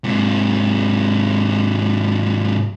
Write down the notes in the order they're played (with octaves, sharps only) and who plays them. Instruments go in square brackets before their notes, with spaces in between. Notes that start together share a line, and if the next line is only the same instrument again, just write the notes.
[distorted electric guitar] G#2 C3